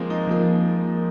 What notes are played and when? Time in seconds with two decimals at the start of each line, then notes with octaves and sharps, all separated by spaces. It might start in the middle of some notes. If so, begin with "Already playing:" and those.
Already playing: F3 G#3 A#3 C4
0.10 D#4
0.27 F3 A#3 F4 A#4